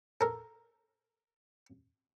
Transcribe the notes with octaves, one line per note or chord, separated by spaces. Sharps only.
A4 A#4